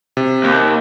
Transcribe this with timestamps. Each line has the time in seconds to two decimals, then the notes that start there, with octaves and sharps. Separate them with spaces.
0.17 C3
0.44 D#2